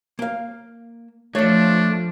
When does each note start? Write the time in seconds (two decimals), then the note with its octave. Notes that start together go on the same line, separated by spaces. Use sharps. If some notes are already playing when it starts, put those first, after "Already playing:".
0.19 A#3 F5
1.35 F3 A3 D4 C#5 D5